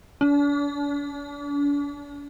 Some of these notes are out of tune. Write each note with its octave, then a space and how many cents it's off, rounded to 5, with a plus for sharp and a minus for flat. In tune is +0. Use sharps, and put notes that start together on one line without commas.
D4 -40